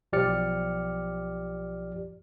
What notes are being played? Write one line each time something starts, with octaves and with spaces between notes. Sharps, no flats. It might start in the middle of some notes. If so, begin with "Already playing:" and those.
B1 F3 G4 D5 F6 C#7